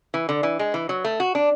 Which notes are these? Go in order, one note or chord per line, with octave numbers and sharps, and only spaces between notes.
E3
D3
E3
G#3
E3
F#3
A3
F#4
D4